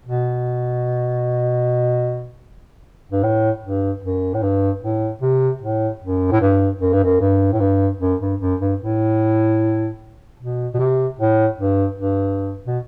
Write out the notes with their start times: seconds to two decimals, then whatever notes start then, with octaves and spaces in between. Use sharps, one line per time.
0.05 B2
3.12 G2
3.23 A2
3.64 G2
4.03 F#2
4.34 A2
4.43 G2
4.83 A2
5.22 C3
5.62 A2
6.02 F#2
6.32 A2
6.41 G2
6.81 F#2
6.93 G2
7.04 F#2
7.21 G2
7.53 A2
7.61 G2
8.01 F#2
8.21 G2
8.41 F#2
8.60 G2
8.80 A2
10.39 B2
10.74 B2
10.79 C3
11.19 A2
11.58 G2
11.98 G2
12.67 B2